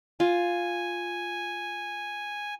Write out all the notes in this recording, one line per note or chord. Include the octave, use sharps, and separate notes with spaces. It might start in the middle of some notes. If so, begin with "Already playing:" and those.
F4 G#5